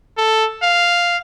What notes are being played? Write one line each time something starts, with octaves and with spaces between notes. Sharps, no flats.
A4
F5